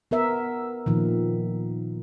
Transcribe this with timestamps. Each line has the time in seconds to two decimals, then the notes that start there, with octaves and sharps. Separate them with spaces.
0.11 B3 A#4 E5
0.86 A#2 D#3 F3